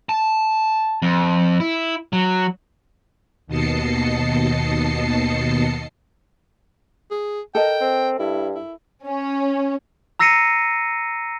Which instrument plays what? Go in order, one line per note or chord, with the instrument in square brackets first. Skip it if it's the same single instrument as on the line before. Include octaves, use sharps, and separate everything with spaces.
[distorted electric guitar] A5
F2
E4
F#3
[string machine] D#2 B2 D#5 A5 C7 C#7
[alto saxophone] G#4
[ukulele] A4 A#4 D#5 [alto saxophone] G5
[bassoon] C4
[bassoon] G2 [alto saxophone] E4
[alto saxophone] E4
[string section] C#4
[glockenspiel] A#5 E6 A#6 C7 C#7 D#7